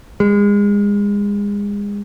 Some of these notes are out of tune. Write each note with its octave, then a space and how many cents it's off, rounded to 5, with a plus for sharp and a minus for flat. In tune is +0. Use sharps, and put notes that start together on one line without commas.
G#3 -30